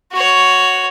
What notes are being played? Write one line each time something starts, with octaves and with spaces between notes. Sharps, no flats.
F#4 C#5